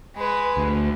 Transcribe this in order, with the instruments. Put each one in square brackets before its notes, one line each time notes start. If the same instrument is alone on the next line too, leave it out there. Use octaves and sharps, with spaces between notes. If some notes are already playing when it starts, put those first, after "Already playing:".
[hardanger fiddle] G#3 B4
[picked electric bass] D2